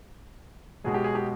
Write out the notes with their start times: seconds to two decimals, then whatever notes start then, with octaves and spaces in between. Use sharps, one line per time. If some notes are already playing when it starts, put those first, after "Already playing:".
0.84 B1 B2 G#3 G#4
0.94 G4
1.04 G#4
1.15 G4